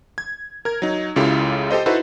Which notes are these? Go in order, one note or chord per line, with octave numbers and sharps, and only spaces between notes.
G#6
A#4 G#6
F#3 D#4
C#2 C#3 E4 F4 G4 A4
G4 A4 C5 D#5
D#4 E4 F#4 A4 B4 C5